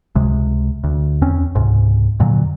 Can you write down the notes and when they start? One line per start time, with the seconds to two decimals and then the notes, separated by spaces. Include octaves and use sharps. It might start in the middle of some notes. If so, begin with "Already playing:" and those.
0.15 C#2 C3 G#3
0.84 D2
1.22 E2 C4 C#4
1.55 C#2 G#2 C3
2.19 F2 A#2 D3 F#3